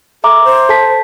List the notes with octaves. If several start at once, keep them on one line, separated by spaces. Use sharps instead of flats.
A4 E5 A#5 D6
C5
A4 A5 B6